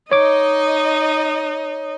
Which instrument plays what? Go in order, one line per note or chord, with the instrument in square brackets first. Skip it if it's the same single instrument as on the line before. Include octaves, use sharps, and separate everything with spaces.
[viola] D#4 D#5 [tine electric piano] C#5 D6